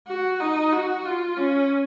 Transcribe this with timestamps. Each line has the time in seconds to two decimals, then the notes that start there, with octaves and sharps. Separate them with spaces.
0.09 F#4
0.40 D#4
0.73 F#4
1.05 F4
1.37 C#4